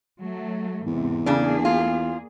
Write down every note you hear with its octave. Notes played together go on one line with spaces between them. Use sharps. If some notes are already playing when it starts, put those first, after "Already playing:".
F#3 A3
E2 G#2 C3
C#3 A#3 D4 G#4
F4